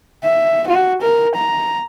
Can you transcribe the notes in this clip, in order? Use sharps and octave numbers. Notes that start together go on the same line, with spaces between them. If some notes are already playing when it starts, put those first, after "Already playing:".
E5
F#4
A#4
A#5